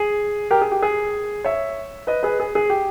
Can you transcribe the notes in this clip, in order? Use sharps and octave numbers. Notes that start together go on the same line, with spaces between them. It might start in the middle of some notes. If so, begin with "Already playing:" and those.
Already playing: G#4
G4 A#4
G#4
G4
G#4
C#5 E5
B4 D#5
G#4 B4
G#4
G#4
G4